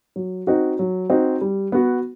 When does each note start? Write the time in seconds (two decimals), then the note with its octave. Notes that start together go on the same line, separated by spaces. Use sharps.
0.16 F#3
0.47 C4 D#4 F#4
0.79 F#3
1.10 C4 D#4 F#4
1.41 G3
1.72 B3 F#4